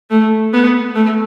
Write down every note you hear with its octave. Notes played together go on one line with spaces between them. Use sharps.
A3
B3
A3